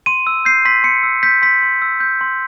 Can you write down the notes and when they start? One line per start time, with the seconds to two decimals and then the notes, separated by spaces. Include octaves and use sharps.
0.06 C6 D#7
0.27 E6
0.45 G6 C7
0.65 C6 B6
0.84 C6 C#7
1.03 E6
1.23 G6 B6
1.42 C6 B6
1.63 C6
1.82 E6
2.00 G6
2.21 C6